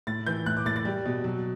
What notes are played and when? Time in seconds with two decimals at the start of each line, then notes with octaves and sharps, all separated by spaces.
0.07 A2 A6
0.26 E3 G6
0.46 A2 F#6
0.57 D6
0.66 A2 A6
0.76 A6
0.85 G3
1.06 B2
1.24 F#3